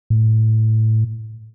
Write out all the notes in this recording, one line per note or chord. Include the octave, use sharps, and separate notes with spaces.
A2